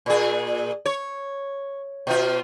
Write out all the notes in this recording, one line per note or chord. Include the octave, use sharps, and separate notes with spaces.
A#2 G#4
C#5
B2 F4